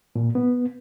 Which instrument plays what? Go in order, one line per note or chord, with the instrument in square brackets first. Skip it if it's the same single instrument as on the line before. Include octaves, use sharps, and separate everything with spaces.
[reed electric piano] A#2
B3